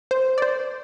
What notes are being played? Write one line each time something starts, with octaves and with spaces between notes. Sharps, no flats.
C5
D5
C5